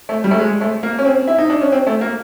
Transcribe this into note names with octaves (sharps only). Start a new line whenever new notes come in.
A3
G3
A3
G#3
A3
A#3
C#4
C4
E4
D#4
D4
C#4
C4
A3
A#3